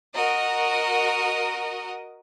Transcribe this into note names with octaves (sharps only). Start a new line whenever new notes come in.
F#4 A#4 D#5